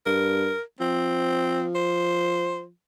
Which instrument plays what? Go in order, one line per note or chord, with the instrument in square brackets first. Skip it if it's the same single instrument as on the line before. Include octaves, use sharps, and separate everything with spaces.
[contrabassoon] G2 [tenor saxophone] A#4
[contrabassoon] F3 [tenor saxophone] C4
[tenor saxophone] C5